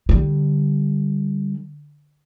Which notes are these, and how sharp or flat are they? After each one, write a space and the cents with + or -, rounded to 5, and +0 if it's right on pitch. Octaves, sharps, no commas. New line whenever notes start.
D3 +0 G3 +0